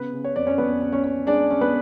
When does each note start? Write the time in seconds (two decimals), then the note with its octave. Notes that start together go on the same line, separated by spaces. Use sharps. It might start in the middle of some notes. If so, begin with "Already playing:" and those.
Already playing: C#3 B3 B4
0.13 C#3
0.24 C#5
0.36 F2 D5
0.47 C#4 C#5
0.58 F2 B3 B4
0.81 C#4
0.92 C#4 C#5
1.04 C#4
1.27 G#3 D4 D5
1.50 C#4
1.61 B3 B4